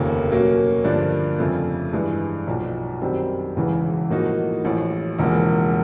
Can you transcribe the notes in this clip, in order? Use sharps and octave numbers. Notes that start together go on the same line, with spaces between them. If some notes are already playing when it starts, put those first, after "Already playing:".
Already playing: F1 D#2 C#3 F3 A#3
B2 F#3 A#3 C#4
G2 D3 F3 A#3 D4
F2 C#3 F3 A3
G2 E3 G#3
B1 A#2 F3
F#2 D#3 G3 C4
E1 E2 C#3 E3
A2 F3 A#3 D#4 F#4
A1 A2 F3
E1 E2 C#3 F3 A#3